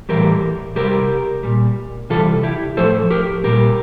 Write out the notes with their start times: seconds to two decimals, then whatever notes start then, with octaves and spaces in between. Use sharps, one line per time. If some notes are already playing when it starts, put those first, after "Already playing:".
0.09 A2 E3 G3 G4 A#4
0.76 C3 G3 G4 A#4
1.43 A#2 G3
2.10 C3 E3 G3 F4 A4
2.43 E4 G4
2.77 A2 F3 A4 C5
3.11 G4 A#4
3.44 A#2 G3 G4 A#4